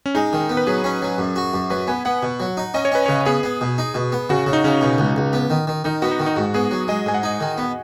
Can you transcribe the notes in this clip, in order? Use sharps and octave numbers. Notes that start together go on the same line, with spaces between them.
C#4
G#3 D#4
D#3
B3
B4
F#3 G#4
C#4
F#3
F#2
F#4
F#2
F#3 B4
B3 G#5
B3 F#5
B2
F#3
D#4
C#4 D#5
C#5
C#4 B4
C#3 C#5
B3 G#4
B3
B2
D#4
B2
B3
C#3 F#4
C#3
D#4
C#3 C#4
B2
C#2
C#2
B3
D#3
D#3
D#3 D#4
B3 F#4
D#4
D#3
D#4
G#2 F#4
B3 G#4
F#3
G#3 D#5
G#2 G#5
F#5
D#4
D#3
B3